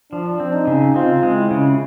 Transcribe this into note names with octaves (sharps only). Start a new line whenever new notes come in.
F3 D4
C4
D#4
C#3
C4 F4
G#3
E4
C#3